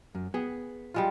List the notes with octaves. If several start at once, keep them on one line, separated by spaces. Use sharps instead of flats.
F#2
B3 G#4
G3 G#3 F4